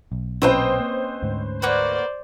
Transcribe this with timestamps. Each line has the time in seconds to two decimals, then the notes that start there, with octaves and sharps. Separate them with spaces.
0.12 B1
0.42 B1 A#2 C4 C#4 B4 C5 D#5 G5
0.80 A#3
1.22 D2 G#2
1.62 A#3 F#4 B4 C5 D5